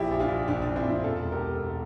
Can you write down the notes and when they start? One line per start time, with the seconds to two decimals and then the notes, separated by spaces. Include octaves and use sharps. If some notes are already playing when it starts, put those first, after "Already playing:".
Already playing: A#1 E4 G4
0.11 A#1
0.20 D4 F4
0.29 A#1
0.48 A#1 D4
0.62 D4
0.67 A#1
0.76 C4 E4
0.85 A#1
0.90 D4 F4
1.04 E1 F4 A4
1.22 E1
1.32 G4 A#4
1.41 A3
1.60 E1